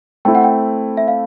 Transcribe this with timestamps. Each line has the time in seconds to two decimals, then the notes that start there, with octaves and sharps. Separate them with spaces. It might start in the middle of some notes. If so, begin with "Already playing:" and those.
0.25 A3 C4 E4 G5
0.35 F#5
0.44 G5
0.97 E5
1.08 F5